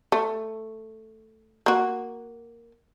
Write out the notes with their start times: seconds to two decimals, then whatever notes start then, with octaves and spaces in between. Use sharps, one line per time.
0.12 A3
1.66 A#3 F#4